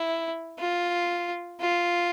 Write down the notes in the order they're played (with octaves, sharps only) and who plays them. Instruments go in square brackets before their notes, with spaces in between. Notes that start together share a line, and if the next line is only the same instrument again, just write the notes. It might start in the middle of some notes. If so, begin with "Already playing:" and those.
Already playing: [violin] E4
F4
F4